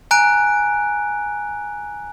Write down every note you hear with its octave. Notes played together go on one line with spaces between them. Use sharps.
G#5 A#5 F#6 D7